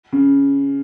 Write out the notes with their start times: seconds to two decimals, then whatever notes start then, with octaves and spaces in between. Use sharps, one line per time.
0.13 C#3